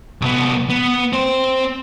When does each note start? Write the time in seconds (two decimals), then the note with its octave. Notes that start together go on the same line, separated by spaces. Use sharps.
0.22 C2 B3
0.69 B3
1.13 C4 C5